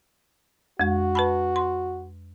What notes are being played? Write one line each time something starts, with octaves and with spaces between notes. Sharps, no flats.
F2 G#3 F#4
B4 A5 B5
C6